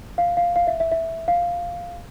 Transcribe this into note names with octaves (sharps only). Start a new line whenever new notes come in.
F5
F5
F5
E5
E5
E5
F5